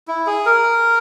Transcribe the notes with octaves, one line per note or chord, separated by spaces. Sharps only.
E4
G#4
A#4